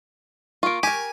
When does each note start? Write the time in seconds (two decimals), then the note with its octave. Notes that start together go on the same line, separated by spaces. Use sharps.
0.63 A#3 F4 C#6 D7
0.83 G4 A#4 G#5